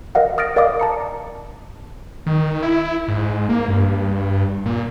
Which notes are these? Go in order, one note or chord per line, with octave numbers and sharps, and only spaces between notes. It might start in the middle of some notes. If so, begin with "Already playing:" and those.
A#4 D#5 F5 F#5
D#6 F6 A6 A#6 D7
A#4 D5 D#5 F5 D6 D#6
A5 A#5 C#7
D#3
E4
G#2
A#3
G2
A#2